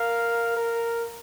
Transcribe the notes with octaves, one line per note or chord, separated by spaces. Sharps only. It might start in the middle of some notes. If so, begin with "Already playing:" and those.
Already playing: A#4 F5
A#4